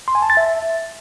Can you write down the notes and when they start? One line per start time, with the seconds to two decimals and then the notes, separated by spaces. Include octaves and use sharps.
0.08 C6
0.15 G#5
0.22 A5
0.30 A6
0.37 E5